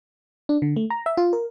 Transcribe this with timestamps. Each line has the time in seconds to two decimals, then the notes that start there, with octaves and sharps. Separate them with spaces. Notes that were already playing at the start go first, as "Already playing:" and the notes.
0.49 D4
0.62 D3
0.76 A3
0.90 A#5
1.06 E5
1.17 F4
1.33 A#4